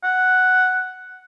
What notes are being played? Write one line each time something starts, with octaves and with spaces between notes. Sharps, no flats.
F#5